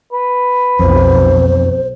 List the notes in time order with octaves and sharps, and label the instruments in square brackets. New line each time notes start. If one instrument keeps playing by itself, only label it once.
[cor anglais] B4
[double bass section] B1 [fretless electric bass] F2 [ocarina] C5